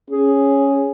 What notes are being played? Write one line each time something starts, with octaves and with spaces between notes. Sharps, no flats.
C#4 G#4